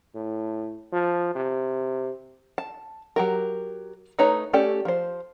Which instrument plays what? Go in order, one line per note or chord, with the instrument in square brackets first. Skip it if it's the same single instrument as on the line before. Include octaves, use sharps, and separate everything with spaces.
[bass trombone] A2
F3
C3
[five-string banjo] A5
F#3 G4 A#4
A3 D#4 B4 C#5 A#5
A3 C#4 G4 A4 D5
F3 C5